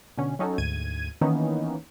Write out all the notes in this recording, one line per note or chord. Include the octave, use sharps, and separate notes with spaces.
B2 D3 C#4
F#3 C#4 D#4 F#4 A4
D2 G#2 G#6 D#7
D#3 E3 A#3 B3 C#4 D#4